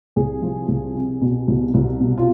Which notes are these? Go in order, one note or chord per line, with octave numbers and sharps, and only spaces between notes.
C2 G#4
F3
C2
C3
B2
C2
C2
B2
F4